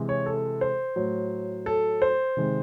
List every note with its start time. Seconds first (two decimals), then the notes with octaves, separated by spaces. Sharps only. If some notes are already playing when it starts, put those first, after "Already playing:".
Already playing: C3 E3 G#3
0.09 C#5
0.26 A4
0.61 C5
0.96 A2 F#3
1.66 A4
2.02 C5
2.37 C3 D#3 G#3